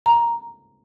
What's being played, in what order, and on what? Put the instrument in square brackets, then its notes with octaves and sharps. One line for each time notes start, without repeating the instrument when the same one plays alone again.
[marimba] A#5